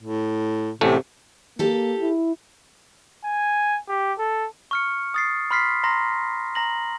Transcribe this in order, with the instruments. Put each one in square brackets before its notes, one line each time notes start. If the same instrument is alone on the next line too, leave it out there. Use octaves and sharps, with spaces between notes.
[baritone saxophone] A2
[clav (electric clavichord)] A1 A2 A3 [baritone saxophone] C3
[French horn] A#3 [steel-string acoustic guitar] G4 A4
[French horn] E4
[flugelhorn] G#5
G4
A4
[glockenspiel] C#6 F6 C#7
D#6 A6 C7
B5 C6 F6 B6 C7
A#5 C6 A#6
A#5 A#6 F#7